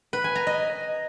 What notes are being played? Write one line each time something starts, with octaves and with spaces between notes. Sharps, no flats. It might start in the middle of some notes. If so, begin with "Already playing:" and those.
B4
G#5
A#5
D#5